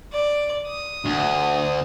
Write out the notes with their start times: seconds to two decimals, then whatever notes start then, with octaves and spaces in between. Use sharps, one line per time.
0.13 D5
0.67 D#6
1.04 D2